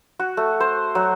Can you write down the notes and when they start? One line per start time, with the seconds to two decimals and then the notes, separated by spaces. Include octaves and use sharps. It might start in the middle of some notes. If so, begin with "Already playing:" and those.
0.19 F#4
0.37 A3
0.60 C5
0.95 F#3